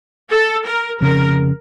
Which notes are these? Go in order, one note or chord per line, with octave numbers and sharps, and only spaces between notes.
A4
A#4
F1 F2 C#3 A#4